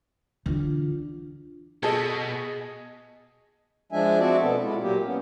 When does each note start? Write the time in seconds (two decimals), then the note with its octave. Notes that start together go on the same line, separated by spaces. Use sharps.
0.46 D3 E3 D4 F4
1.83 B2 G#4 A4 D#5
3.92 F3 G#3 D4 E5 G#5
4.20 C4 F#4 D5 E5 A5
4.41 B2 B3 A4
4.62 G#3 E4 F4
4.82 A#2 F#3 A#3 G4
5.05 B3 C#4